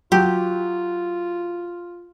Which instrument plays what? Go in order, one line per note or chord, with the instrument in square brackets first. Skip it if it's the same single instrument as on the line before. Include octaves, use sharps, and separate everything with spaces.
[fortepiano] F#3 [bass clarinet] F4 [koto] G4